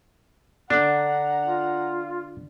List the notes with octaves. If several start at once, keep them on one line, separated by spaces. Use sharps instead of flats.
D3 D4 F#5 A#5
F4